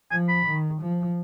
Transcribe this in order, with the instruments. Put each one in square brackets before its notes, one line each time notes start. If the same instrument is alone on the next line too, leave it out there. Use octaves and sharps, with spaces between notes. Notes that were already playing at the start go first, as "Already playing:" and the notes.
[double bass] F3 [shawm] G#5
[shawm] B5
[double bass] D#3
F3